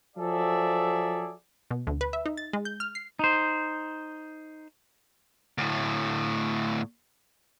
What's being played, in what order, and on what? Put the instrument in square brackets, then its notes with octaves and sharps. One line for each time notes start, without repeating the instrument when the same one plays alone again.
[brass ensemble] F3 F#3 G#4 A4 D5 E5
[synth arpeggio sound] B2
D2
B4
E5
D#4
A6
G#3
G6
F6
C7
[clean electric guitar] D#4 C5
[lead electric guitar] D2 A2